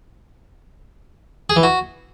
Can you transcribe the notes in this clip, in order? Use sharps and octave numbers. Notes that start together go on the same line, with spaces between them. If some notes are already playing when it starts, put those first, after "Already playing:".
G#4
E3
F#4